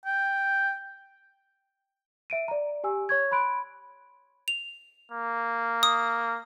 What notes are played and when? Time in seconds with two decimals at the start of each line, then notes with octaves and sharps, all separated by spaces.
0.06 G5
2.30 E5 D7 D#7
2.48 D5 A#5
2.84 G4 G#5 E6
3.09 C#5 C#6 G#6
3.31 B5 C6 F#6 D7
4.48 F7
5.11 A#3
5.83 D#6